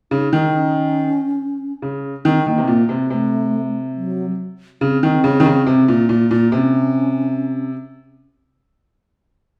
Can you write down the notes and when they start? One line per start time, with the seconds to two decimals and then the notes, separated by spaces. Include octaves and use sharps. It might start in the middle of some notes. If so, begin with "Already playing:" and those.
0.11 C#3 D#4
0.33 D#3
0.53 C#4
1.82 C#3
2.25 D#3 C4
2.46 D#3 A#3
2.58 C3
2.68 A#2 A#3
2.89 C3
3.10 C3 A3
3.96 F#3
4.81 C#3 C4
5.03 D#3
5.24 C#3
5.40 D#3
5.46 C#3
5.67 C3
5.88 A#2
6.09 A#2
6.31 A#2
6.52 C3 C#4